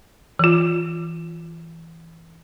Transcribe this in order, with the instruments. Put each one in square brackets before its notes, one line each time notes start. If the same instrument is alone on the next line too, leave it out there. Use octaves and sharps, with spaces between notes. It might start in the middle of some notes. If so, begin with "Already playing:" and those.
[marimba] E3 F4